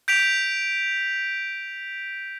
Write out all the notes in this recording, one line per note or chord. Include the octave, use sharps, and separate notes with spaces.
G6 B6 D7 F7